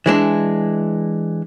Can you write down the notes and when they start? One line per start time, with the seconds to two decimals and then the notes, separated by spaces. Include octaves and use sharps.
0.06 E3 G#3 D4